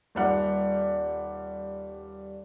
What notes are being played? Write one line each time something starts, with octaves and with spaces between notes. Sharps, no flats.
D#1 G3 F#5